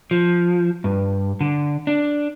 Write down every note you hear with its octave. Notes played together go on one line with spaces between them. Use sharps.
F3
G2
D3
D4